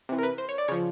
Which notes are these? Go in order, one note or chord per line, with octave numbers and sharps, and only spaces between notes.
C3 E3
A#4
B4
C5
C#5
D5
C#3 F3 C#5